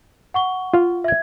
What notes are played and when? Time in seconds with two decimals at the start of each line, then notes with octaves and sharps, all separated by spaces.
0.34 F#5 C#6 G7
0.74 F4 F5
1.04 E5 G#6